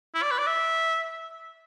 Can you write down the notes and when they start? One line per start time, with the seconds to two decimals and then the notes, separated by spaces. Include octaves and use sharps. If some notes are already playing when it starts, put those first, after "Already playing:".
0.15 E4
0.23 D5
0.31 B4
0.38 D5
0.47 E5